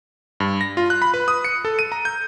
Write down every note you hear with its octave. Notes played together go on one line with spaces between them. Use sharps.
G2
A#6
F4
F#6
B5
B4
D#6
C#7
A4
D#7
A#5
G6